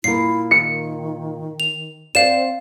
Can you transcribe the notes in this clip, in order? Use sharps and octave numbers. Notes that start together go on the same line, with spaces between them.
A#2 E4 A#4 C7
D#3 C#7
F7
C4 C5 D5 F5 G5 E7